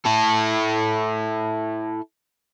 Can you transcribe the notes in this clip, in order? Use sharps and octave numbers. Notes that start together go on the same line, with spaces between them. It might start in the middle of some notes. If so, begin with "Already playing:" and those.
E4 A4